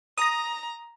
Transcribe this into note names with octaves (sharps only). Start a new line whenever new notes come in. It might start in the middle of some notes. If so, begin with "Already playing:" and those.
A#5 D#6 A#6